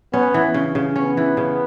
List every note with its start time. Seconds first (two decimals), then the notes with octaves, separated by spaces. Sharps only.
0.13 B3 C#4
0.34 E3
0.54 C#3
0.75 C#3
0.96 B3 C#4
1.17 E3
1.37 C#3